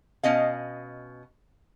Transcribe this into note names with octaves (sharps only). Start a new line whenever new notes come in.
B2 C#4 D#5 F5